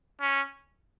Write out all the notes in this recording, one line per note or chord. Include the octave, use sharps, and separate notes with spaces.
C#4